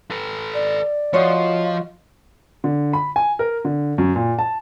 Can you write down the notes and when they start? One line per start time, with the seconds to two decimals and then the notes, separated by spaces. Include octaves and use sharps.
0.11 A4 B4
0.54 D5
1.14 F3 F4 F#4 C#5 D#5
2.64 D3
2.93 B5
3.16 G#5
3.39 A#4
3.65 D3
3.98 F#2
4.16 A#2
4.39 A5